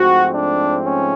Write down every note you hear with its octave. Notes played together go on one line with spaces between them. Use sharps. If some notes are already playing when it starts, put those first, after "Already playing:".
Already playing: G#2 F3 A3 C4 F#4
D4
C#4